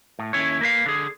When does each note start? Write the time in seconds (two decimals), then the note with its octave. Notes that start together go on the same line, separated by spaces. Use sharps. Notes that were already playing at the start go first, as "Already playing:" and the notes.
0.19 A2
0.33 D#2 C#4 E4 C#5
0.61 A#3 B4 F5
0.86 D3 G#4